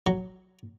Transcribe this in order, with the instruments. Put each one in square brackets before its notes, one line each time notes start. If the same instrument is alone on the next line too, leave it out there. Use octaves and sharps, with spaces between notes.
[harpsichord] F#3